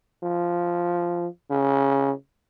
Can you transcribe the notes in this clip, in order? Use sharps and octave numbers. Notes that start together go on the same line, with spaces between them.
F3
C#3